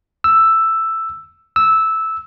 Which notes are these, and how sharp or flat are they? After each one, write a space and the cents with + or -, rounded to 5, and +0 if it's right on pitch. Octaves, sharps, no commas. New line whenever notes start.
E6 +5
E6 -10